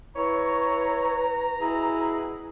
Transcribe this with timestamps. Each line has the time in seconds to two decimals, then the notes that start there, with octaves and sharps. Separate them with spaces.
0.16 E4 B4 C#5 A#5
1.60 B2 B3 E4 G#4